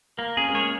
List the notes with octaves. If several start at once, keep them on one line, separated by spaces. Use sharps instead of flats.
A#3 A#4
C#4 G#4
G#3
A#3 C#5